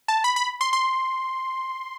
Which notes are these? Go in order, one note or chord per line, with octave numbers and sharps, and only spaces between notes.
A5
B5
B5
C6
C6